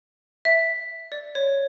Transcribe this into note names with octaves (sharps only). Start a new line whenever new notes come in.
E5
D5
C#5